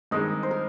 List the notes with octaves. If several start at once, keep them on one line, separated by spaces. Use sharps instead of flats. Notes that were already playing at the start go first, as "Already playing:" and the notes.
G2 D#3 G#3 C4 D#4 D#5
C5
A#4